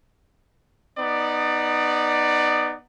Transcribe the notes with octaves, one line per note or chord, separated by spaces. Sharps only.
B3 D#4 D5